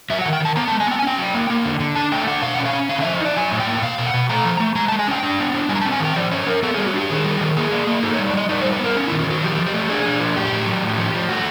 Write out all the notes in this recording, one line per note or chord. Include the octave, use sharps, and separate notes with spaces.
F#3 E5
D#3 F#5
G5
D#3 A5
B3 A#5
G#3 A5
G#5
B3 G5
G#5
C#4 G5
F#3
A#3
A#3
D3
D3
D4 A5
A3 G5
D4 F#5
B2 F5
C#4 F#5
F5
C#4
D3 F5
F3 E5
D#5
D#4 D5
F#3 G#5
A2
G5
A#3
B2 F5
B2
F#5
B2
A3 A#5
F3
A3
G#3 A#5
G#3 A5
G#5
C#4 G5
D4
B3
D4
G3 G#5
A#5
C4 A5
G#5
D#3 G5
F3 D5
C#4 C#5
C#4 A#4
B3 A4
G3 G#4
F#4
D4 G4
D#3 G#4
G3
D#3
A#3 G#4
A#3
A#3
D#4 A4
G3 C#5
D5
G3 D#5
D#4 D5
G3 C5
B4
B3 A#4
C#4
D#3 E4
F4
D#3 F#4
F3 G4
F3
G4
A3
D4 G#4
D4
F3
A2 G4
A2
F#3
A2
F3
F3
A3 F#4